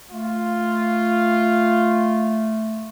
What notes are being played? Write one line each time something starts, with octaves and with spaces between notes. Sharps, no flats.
A3 F4